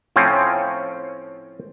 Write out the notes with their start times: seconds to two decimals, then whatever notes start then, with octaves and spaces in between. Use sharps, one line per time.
0.16 A2 F3 C4 C#4